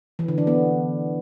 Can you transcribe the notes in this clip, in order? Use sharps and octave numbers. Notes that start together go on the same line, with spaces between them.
E3
D3
D4
B3